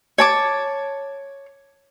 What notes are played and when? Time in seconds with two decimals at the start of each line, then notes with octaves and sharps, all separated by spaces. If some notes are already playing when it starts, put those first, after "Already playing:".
0.18 C#5 A5 D6